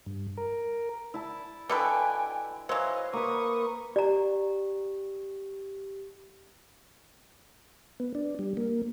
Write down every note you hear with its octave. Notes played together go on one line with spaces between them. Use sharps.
G2
A#4
E4 A5
B2 D3 B4 G5 G#5 D6
E3 F#3 C5 D#5 F5
A#3 B4 C#6 D#6
G4 D5 A#5
B3
D4
G3
A#3